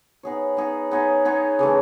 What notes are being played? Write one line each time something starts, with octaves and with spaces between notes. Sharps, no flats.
B3 D#4 G#4 C#5
B3 D#4 G#4 C#5
B3 D#4 G#4 C#5
B3 D#4 G#4 C#5
C#3 E3 A3